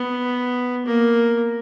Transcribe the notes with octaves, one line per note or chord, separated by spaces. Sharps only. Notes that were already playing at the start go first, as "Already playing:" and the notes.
Already playing: B3
A#3